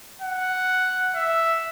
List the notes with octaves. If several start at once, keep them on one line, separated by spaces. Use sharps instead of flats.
F#5
E5